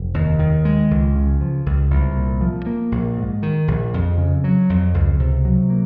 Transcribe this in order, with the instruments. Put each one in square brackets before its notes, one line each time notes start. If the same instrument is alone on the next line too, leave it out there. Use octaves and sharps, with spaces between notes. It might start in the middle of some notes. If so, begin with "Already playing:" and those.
Already playing: [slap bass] F1
D#2
D#3
G#3
C#2
C#3
F3
C#2
C2
A#2
F3
A#3
A#1
G#2
D#3
A#1
F2
C#3
F#3
F2
C#2
C3
F#3
A#3